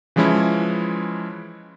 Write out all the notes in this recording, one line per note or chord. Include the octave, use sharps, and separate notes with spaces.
E3 F3 G#3 C#4 E4